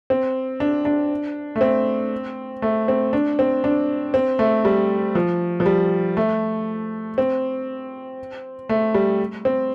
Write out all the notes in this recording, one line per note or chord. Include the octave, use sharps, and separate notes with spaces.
C4
D4
D4
A3
C4
A3
C4
D4
C4
D4
C4
A3
G3
F3
F3
G3
A3
C4
A3
G3
C4